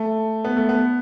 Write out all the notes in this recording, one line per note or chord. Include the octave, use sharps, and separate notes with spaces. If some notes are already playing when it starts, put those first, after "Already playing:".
Already playing: A3
B3
A3
B3